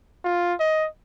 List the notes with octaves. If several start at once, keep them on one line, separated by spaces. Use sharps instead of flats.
F4
D#5